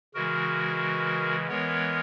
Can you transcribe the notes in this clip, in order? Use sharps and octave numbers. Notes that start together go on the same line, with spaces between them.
C#3 E3 G#3 F#4 A#4
E3 G#3 B3 A#4 C#5